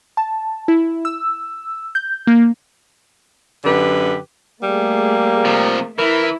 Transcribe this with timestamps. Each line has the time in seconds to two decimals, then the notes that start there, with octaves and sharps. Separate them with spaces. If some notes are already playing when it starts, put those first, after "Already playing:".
0.17 A5
0.68 E4
1.05 E6
1.95 G6
2.27 A#3
3.65 F#2 D3 G4 B4
4.63 G3 A3 A#3 G#4
5.45 C3 F3
5.99 E3 E4 A#4